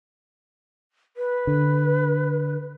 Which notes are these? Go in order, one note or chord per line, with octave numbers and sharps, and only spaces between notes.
B4
D3